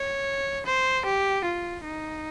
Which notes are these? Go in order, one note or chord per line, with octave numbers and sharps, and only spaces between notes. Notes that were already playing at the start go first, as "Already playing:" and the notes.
Already playing: C#5
C5
G4
F4
D#4